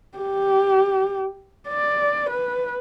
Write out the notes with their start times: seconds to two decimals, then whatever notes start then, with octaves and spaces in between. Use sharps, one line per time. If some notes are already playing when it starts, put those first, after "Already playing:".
0.18 G4
1.68 D5
2.29 B4